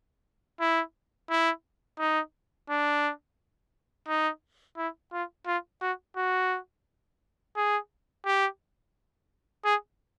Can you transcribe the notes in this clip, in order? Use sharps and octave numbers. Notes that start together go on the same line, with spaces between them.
E4
E4
D#4
D4
D#4
E4
F4
F4
F#4
F#4
G#4
G4
G#4